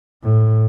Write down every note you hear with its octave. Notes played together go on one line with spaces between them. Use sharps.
A2